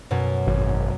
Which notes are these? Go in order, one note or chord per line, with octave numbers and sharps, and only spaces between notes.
F#2 B2
G#1